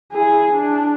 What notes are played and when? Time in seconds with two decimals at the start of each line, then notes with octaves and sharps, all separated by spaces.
0.13 E4 G#4
0.52 D4